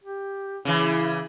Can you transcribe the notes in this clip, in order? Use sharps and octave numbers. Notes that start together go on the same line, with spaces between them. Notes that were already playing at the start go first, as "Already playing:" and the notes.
G4
C#3 E3 E4